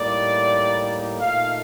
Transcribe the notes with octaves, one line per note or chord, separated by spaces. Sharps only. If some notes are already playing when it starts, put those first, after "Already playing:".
Already playing: A2 G3 A#3 D#4 D5
A#2 A3 D#4 F5